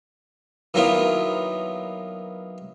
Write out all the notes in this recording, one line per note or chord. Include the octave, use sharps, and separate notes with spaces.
D#3 F#3 A#3 B3 E4 F4